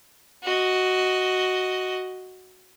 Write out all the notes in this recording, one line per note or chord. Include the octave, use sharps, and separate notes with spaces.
F#4 D#5